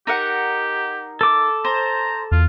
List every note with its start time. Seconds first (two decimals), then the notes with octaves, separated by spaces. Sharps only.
0.07 D#4 G4 A#4 F#5
1.21 A4 D6
1.65 C5 A#5
2.32 E2 F4